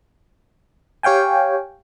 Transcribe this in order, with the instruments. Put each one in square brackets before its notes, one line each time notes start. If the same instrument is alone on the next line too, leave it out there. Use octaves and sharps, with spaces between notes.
[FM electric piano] G4 C#5 F5 G5 G#5